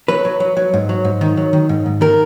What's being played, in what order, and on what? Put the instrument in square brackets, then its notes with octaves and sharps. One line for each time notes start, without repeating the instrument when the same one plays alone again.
[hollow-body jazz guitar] F#3 B4
F#3
F#3
F#3
G#2
F#3
G#2
D#3
F#3
D#3
G#2
G#2
D#3 A#4